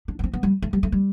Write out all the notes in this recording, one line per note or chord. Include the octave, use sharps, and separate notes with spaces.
D4
B3
C4
B3
G3
A3
G3
A3
G3